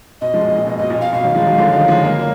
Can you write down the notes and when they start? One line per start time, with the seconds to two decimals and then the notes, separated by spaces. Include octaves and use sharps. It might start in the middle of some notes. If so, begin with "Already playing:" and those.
0.21 B2 D#5
0.34 F3 G#3
0.39 B2
0.44 A#2
0.55 A#2
0.67 B2 D#5
0.79 B2 D#5
0.90 A#2
1.01 F5
1.13 B2 F5
1.23 D#3 F#3
1.35 F3 G#3
1.46 D#3 F#3
1.58 D3 F3
1.73 D#3 F#3
1.88 F3 G#3
2.04 F#3 A#3
2.19 A#3